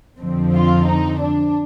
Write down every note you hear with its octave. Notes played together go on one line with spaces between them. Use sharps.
F2 D3 F3 C4
F4
D#4
D4